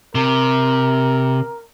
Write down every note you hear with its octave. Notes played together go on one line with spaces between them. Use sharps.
C3 A#4